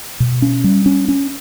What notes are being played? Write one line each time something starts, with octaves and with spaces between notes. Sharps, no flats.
B2
C#4
G3
C#4
C#4